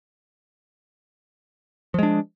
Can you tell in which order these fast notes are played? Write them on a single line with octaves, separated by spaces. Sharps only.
F3 G#3 D4